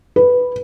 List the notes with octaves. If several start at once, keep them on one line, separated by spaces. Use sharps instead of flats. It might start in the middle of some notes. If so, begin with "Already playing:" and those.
B4